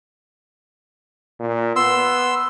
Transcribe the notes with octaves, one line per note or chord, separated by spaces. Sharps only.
A#2
B3 C6 E6